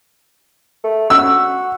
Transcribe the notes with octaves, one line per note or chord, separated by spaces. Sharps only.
A3
F#4 E6